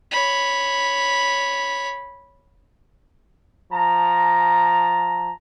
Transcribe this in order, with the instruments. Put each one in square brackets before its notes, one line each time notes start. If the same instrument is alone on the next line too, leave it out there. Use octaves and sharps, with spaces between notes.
[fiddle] C#5 B5
[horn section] F3 A5 A#5